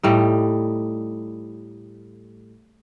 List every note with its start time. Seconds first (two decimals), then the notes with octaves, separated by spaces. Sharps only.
0.03 A2 G3 D#4